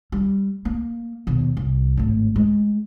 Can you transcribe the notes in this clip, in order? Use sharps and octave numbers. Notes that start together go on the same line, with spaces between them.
G3
A#3
D#2 B2
C2
G#1 A2
G#3